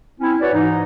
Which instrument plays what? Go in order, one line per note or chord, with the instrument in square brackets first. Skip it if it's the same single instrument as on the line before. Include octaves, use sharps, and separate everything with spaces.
[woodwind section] C4 C#4 E4
F#4 B4 C#5 D5
G#2 E3 D#4